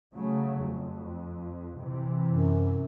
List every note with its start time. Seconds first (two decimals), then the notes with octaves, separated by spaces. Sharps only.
0.15 C#3 F#3 A3
0.64 F2
1.79 C3 E3
2.29 F#2